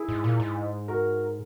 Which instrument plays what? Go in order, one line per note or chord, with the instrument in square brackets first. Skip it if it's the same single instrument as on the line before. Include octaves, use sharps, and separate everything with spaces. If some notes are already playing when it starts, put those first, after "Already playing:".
Already playing: [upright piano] E4 G#4
[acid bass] G#2
A#2
G#2
[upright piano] F#4 A#4